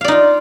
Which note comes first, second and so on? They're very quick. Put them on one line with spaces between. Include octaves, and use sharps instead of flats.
F5 D5 D#4 F4